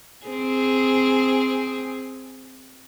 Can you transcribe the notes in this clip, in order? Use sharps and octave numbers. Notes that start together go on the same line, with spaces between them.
C4 G#4